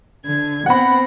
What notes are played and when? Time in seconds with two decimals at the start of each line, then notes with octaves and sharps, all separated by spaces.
0.25 D3 G#6
0.66 B3 C4 F#5 B5 A#6